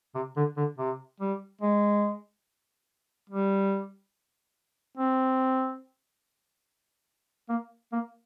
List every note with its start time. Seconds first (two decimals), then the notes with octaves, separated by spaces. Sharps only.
0.15 C3
0.37 D3
0.57 D3
0.78 C3
1.20 G3
1.61 G#3
3.30 G3
4.98 C4
7.49 A#3
7.93 A#3